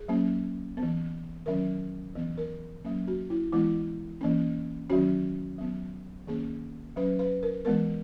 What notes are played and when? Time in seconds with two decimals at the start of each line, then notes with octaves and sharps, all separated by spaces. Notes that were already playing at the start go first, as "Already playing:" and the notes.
Already playing: G#4
0.08 F#3 A#3 C#4
0.77 B3
0.83 E3
1.46 D#3 F#3 C#4 A#4
2.15 E3 B3
2.38 A#4
2.84 F#3 A#3 C#4
3.08 F#4
3.30 E4
3.52 E3 G#3 B3 E4
4.21 E3 A#3 C#4
4.90 D#3 F#3 C#4 F#4
5.58 F#3 B3
6.27 D#3 A#3 C#4 G#4
6.96 F#3 C#4 B4
7.19 B4
7.43 A#4
7.65 E3 G#3 B3 A#4